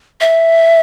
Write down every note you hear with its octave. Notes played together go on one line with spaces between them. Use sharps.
E5